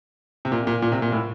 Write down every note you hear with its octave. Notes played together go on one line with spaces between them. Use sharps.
C3
A#2
A#2
A#2
C3
A#2
A2